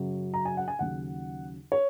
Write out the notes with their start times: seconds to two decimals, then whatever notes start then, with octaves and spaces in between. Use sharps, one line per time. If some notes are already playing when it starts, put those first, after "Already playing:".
Already playing: F#2 C#3 F#3
0.34 A#5
0.45 G#5
0.57 F#5
0.68 G#5
0.79 D#2 C#3 F#3 F#5
1.72 C#5